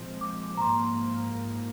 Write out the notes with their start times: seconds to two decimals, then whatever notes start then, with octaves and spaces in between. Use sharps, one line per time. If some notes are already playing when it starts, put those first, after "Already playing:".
Already playing: A#2 F3 G#3 C4
0.21 D6
0.57 A#5
0.61 G#2 F3 A#3 C6